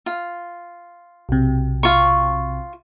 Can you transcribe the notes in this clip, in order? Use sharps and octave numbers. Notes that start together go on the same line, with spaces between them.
F4
B1 C3
F4 C#6